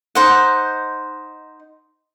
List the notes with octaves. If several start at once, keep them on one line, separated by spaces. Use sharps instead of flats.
D#4 C5 F#5